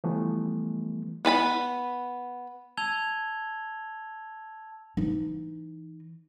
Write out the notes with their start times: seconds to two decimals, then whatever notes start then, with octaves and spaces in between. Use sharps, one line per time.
0.04 E3 F3 G3 A3 B3
1.25 B3 B4 A5 B5
2.77 A5 E6 G#6 F7 G7
4.97 E3 D#4